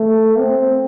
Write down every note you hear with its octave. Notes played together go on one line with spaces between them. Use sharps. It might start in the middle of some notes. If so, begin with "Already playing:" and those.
Already playing: A3
C4